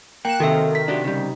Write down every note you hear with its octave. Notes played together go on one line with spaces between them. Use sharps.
A#3 G5 F#6 E7
C3 D#3 F#4 A4 E5
B6
D4 F#4 G4
C#3 G3